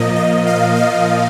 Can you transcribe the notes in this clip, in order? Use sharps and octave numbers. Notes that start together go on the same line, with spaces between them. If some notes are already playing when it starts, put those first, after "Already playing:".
Already playing: A#2 F3 A#3 D#5
D#5
F5
F5